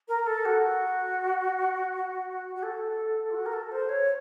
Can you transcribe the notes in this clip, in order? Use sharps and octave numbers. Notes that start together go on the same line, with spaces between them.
A#4
A4
F#4
F#4
A4
F4
F#4
A#4
A4
C5
C#5